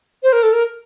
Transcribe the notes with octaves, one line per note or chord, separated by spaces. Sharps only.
C5
A#4
A4
A#4